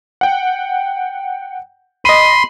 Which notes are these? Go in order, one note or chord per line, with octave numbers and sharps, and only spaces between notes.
F#5 G5
D#5 B5 C6 D#7